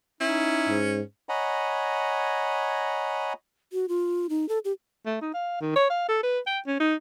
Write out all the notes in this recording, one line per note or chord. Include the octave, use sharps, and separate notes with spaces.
C#4 D#4 E4
G#2
C#5 D#5 F#5 G#5 A#5 B5
F#4
F4
D#4
A4
G4
A3
D#4
F5
D#3
C#5
F5
A4
B4
G5
C#4
D#4